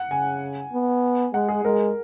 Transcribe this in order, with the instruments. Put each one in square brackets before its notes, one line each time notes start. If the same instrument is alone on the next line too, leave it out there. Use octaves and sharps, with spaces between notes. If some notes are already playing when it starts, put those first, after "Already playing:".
Already playing: [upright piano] F#5
[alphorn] C#3 [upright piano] G#5
[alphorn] B3
[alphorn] G#3 [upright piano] F#5
[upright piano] G#4
[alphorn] G#3 [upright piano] A#4